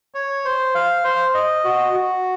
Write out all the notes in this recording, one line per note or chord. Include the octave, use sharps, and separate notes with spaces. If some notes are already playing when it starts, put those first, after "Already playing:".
C#5
C5
F5
C5
D#5
F#4
F#4